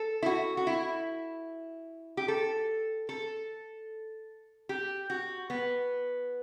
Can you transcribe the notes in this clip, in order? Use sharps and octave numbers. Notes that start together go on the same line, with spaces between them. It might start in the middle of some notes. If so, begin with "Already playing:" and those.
Already playing: A4
E4
F#4
F#4
E4
G4
A4
A4
G4
F#4
B3